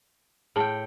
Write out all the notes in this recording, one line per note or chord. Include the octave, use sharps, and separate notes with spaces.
A2 G#4 G5 A5